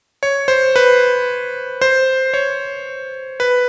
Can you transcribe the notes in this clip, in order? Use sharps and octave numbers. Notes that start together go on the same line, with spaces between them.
C#5
C5
B4
C5
C#5
B4